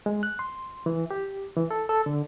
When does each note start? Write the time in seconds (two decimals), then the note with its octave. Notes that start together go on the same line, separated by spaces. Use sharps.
0.06 G#3
0.23 F#6
0.39 C6
0.86 E3
1.11 G4
1.57 E3
1.71 A4
1.89 A4
2.06 D3